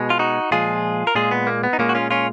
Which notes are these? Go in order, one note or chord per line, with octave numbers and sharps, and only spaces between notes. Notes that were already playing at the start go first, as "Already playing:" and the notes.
Already playing: B2 G#3
F4
D#4 F#4
A#2 F3 G#3 F4 G#4
A#4
A#2 G#3 F4 G#4
B3
A#3
B3
D#4
A#2 G#3 A#3 C#4
F#4
C#4 F4
C#4 F4